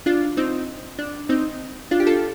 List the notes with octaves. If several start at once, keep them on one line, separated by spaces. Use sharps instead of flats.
D4 F4
C4 D#4
D4
C4 D#4
D4 F4
G4
F4 A4